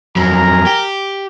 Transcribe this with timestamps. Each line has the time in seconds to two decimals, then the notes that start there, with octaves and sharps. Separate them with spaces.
0.16 F2 F#3 A#4 G#5 A#5
0.66 G4